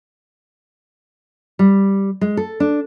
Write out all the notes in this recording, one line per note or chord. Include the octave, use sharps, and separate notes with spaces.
G3
G#3
A4
D4